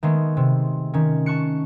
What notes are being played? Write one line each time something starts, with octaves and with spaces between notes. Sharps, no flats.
D#3 G#3 A3 B3
C3
D#3 C#4
A5 C#6 F#6 C#7